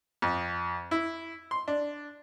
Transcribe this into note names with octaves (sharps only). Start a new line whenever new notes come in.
F2
E4
C6
D4